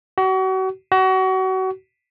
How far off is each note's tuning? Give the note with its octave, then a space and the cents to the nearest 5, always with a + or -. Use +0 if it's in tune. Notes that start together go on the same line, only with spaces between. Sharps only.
F#4 +35
F#4 +30